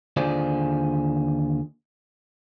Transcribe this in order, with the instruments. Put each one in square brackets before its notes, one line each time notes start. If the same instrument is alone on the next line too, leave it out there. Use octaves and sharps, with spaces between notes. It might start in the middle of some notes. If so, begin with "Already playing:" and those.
[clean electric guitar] D#2 D3 F4 G#4 C5 D5